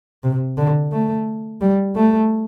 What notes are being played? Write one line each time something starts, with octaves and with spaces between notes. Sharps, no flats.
C3
D3
A3
G3
A3